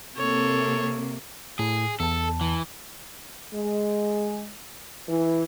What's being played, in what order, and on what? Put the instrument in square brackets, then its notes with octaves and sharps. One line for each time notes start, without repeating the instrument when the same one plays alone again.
[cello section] C3 A#3 [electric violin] A4 C#5
[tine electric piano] A2 [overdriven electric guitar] G#4
[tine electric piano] E2 A5 [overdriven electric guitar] A4
[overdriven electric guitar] E3
[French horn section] G#3
E3